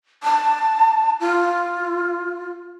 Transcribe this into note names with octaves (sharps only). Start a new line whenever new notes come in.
A5
F4